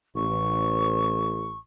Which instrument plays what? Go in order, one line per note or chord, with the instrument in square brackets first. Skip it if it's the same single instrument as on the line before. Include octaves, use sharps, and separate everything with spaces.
[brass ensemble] A1 [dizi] C#6